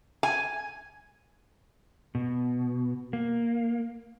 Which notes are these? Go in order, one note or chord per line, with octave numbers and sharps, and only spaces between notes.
G#5
B2
A#3